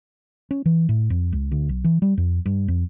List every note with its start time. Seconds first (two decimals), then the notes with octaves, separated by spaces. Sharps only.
0.51 C#4
0.66 E3
0.89 A2
1.10 F2
1.32 C#2
1.52 D2
1.69 B1
1.84 E3
2.02 G3
2.18 F2
2.46 G2
2.68 F2